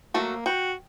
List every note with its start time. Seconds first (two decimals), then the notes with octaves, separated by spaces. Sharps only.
0.14 F#3 A3 A#3 F#4
0.46 F#4 G5